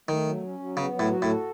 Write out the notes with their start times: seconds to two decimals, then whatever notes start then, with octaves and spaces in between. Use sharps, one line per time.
0.08 D#3 A3
0.26 F#3
0.43 C#4
0.59 F#3
0.77 C#3 B3
0.93 F#3
0.99 A2
1.11 F#4
1.22 A2
1.28 A4